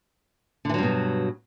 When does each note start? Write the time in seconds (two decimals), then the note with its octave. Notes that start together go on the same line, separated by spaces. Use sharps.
0.65 D3
0.69 E3
0.74 F#3
0.78 G2
0.83 B2